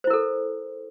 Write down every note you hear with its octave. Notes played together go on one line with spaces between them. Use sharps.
E4 A4 A#4 C5